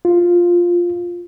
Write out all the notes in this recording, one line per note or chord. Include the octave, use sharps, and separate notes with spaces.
F4